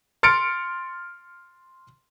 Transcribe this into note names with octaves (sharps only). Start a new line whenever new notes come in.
C6 F6 A6 C#7 D7